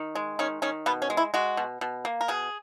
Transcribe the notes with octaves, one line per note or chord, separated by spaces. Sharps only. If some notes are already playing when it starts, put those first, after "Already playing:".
Already playing: D#3
G#3
D#3 C#4
D#3 C#4
B2 B3
C#4
G#3
E4
G#3 F#4
B2
B2
A#3
A#4
B2 G#4